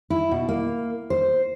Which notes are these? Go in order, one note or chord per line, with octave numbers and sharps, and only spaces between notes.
E4
B2
A#3
C5